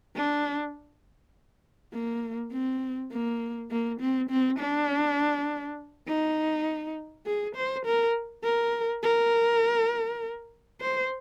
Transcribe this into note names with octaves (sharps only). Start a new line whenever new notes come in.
D4
A#3
C4
A#3
A#3
C4
C4
D4
D#4
G#4
C5
A#4
A#4
A#4
C5